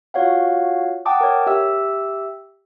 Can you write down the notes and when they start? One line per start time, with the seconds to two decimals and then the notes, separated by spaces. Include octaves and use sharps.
0.14 F4 F#4 C#5 F5 F#5
1.05 F#5 G5 A5 D6 D#6
1.21 A#4 C#5
1.47 G4 E5 E6